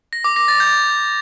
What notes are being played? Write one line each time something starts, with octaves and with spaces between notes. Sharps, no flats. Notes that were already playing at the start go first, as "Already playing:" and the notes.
A#6
D6
A#6
A6
G6